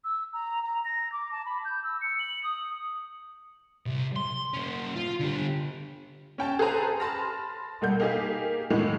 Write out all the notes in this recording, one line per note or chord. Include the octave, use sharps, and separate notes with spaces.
E6
A#5
A#5
A#6
D6
A5
B5
G6
E6
C#7
F#7
D#6
C2 C3
C6
A#3 C#4
F4
D3 G4
C#4 G5 A5
G#4 A4 B4 C5 A#5 D#6
A5 B5 C6 F6 A#6
B1 G3 A#3 F#5 G6
A#3 D#4 G4 G#4 F5
A2 D#3 E3 F#3 G#3